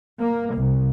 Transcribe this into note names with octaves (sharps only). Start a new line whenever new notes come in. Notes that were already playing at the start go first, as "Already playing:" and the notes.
A#3
C2